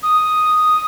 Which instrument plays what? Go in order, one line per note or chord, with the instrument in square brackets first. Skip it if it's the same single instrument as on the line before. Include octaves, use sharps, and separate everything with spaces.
[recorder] D#6